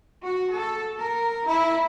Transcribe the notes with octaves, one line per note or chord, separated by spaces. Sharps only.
F#4
A4
A#4
E4